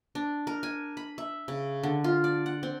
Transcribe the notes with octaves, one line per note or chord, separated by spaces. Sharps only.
D4
A#4
G#5
B5
E5
C#3
D3
F4
D5
F#5
C4